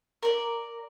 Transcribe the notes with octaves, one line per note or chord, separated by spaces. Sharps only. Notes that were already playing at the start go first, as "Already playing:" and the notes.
A#4 D5